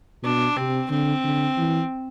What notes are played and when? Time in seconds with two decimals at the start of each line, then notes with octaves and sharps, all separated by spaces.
0.23 B2 D4
0.56 C3 C4
0.90 D3 C4
1.24 D3
1.58 E3